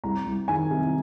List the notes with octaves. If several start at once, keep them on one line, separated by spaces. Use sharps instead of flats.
C2 A#5
C2
D#3 G#5
C3